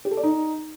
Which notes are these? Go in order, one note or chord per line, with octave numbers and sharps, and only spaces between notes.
G4
A4
D5
D#4